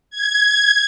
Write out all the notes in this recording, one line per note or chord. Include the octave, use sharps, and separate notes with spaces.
G#6